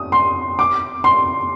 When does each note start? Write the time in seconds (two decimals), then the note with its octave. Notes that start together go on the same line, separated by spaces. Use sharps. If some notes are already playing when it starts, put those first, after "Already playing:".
Already playing: D#6
0.12 C6
0.59 D6
1.04 C6